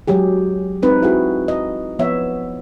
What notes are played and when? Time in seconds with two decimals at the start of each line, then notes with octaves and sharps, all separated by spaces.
0.08 F#3 G#3 G4 G#4
0.82 G#3 C4 D#4 B4
1.02 E4 F#4 G#4
1.48 D#5
1.99 F3 B3 C#5 E5